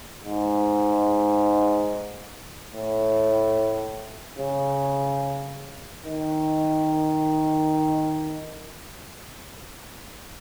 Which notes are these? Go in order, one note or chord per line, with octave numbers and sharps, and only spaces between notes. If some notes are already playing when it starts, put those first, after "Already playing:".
G#2
A2
C#3
D#3